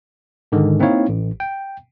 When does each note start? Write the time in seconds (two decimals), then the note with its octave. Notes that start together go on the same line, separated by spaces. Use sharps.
0.52 G#2 D3 D#3 G#3
0.80 A#3 C4 D#4 E4 C#5 F5
1.09 A1
1.40 G5